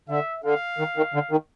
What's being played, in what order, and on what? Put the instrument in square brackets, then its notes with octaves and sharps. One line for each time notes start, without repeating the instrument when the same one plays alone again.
[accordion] D3 [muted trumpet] E5
[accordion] D3 [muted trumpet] F5
[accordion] D#3
D#3
D3
D#3